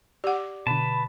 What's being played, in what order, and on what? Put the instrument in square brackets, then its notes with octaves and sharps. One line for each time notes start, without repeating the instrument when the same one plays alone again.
[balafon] G4 F#5 [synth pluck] D5 D6
[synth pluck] B2 D3 [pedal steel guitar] B4 A5 [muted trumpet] B5